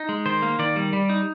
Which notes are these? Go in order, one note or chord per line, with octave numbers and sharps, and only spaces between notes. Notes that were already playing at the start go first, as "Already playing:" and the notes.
Already playing: D#4
G#3
D#3 C5
A#3
D#3 D5
G3
G3
D#4